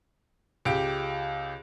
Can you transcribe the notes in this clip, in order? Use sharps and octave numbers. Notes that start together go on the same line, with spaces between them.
C#2 G4 D7